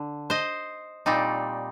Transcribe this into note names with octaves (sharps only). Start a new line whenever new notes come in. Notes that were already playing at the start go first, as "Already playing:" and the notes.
Already playing: D3
C5 D#5
A#2 G3 C4 D#4